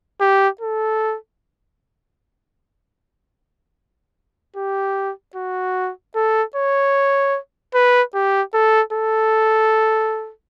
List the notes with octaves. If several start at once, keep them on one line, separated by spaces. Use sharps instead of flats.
G4
A4
G4
F#4
A4
C#5
B4
G4
A4
A4